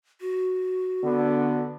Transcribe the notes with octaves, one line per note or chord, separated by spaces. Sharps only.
F#4
D3 B3